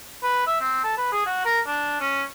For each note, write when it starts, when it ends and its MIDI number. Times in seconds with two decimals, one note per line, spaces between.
0.23 0.46 71
0.47 0.59 76
0.60 0.81 60
0.84 0.93 69
0.98 1.10 71
1.12 1.25 68
1.26 1.41 66
1.45 1.60 70
1.67 1.96 62
2.01 2.23 61